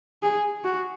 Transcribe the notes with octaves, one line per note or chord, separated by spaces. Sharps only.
G#4
F#4